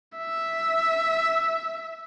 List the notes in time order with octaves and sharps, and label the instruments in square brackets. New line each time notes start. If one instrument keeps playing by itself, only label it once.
[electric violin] E5